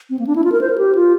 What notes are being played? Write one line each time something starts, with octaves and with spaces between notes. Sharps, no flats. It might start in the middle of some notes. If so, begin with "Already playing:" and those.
C4
A#3
D4
E4
F4
A#4
C5
A#4
G4
F4